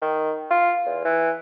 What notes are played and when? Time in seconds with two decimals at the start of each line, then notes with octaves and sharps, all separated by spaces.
0.01 D#3
0.50 F4
0.86 E2
1.04 E3